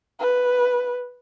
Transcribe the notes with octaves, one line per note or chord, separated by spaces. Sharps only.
B4